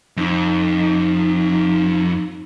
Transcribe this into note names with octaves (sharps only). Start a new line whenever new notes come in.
F2 D#4